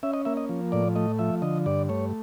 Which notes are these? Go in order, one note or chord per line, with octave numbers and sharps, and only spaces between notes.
C#4 E5
D#5
A#3 E5
D#5
F3
A2 D5
A3 D#5
F3 E5
D3 D#5
G2 D5
A3 C#5